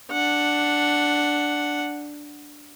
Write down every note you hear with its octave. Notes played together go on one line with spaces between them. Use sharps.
D4 F#5